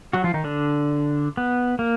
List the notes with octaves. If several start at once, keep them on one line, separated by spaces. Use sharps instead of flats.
F#3 F#4
F3 F4
D#3 D#4
D3 D4
B3
A#3